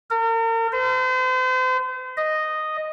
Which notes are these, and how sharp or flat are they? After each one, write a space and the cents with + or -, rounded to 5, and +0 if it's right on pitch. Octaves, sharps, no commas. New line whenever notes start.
A#4 -40
C5 -40
D#5 -5